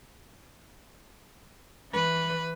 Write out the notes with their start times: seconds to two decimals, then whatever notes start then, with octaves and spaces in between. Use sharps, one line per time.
1.91 E3 B4